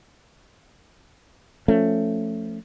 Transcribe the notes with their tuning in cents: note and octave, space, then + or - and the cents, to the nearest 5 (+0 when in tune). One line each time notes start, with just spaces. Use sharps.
F3 +0 A3 +15 C#4 +10